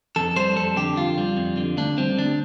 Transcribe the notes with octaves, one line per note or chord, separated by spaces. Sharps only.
F2 A4
G3 C5
F2 A4
D3 G4
F2 F4
G3
F2
D3
D2 D4
G3 C4
D2 D4